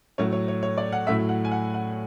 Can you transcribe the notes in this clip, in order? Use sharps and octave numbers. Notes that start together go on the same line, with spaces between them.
A2 F#3 A3 C#5
C#5
C#5
C#5
D5
F#5
A2 F#3 A3 E5
F#5
G#5
F#5
F#5